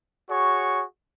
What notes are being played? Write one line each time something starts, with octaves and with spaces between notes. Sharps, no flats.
F#4 G#4 C#5 C#6